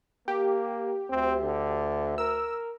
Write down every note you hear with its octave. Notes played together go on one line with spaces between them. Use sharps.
A#3 G4
D2 C4
D3
A#4 E6